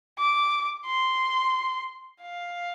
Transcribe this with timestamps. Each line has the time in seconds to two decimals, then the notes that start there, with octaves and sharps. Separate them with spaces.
0.19 D6
0.86 C6
2.22 F5